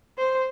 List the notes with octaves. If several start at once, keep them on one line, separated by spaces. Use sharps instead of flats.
C5